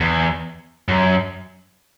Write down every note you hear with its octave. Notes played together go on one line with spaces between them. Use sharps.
E2
F#2